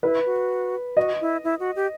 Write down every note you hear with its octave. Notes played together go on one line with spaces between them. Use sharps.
E4 B4
F#4
F#4 D#5
E4
E4
F#4
G4